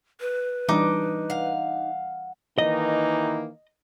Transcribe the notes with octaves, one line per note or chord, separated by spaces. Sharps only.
B4
E3 G3 D4 D#4 D6
F5 F#5
D#3 E3 A#3 D#4 D#5